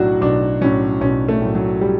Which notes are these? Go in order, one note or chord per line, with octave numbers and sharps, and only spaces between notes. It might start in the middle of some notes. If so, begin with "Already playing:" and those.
Already playing: B1 A2 F#3 D4 F#4
B1 D4
A2 F#3 C#4
B1 C#4
A3
A2 F#3
F#3
G3